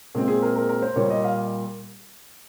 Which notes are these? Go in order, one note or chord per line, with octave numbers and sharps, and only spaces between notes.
A#2 G#3 C4 G#4
G#4
A#4
A#4
A#4
C5
A#2 G3 A#3 C#5
D#5
F5